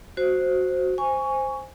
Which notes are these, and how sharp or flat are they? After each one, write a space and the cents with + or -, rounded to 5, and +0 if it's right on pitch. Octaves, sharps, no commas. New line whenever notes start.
F#4 +0 C5 +0
C5 +0 G#5 -10 C#6 +15